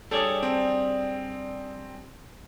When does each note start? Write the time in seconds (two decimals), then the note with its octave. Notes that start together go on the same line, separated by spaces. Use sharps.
0.11 G3 D4 G#4 A4 C#5 D5
0.43 C4